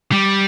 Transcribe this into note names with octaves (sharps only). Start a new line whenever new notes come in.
G3